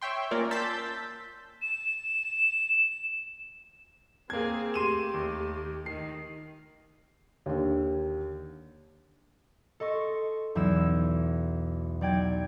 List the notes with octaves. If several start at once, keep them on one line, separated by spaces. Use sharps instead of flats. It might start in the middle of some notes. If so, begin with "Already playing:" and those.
C#5 E5 G5 C6
A#3 C#4 F4 A#4 D5
A5 C6 E6 G6 A6 B6
E7
A#3 C4 G#4 G#6
A3 G4 C6 D#7 E7
D#2
D#3 C7
D#2 D3
A4 D#5 C6 C#6
B1 E2 E3 E4 E6 E7
B1 D5 G5 G#6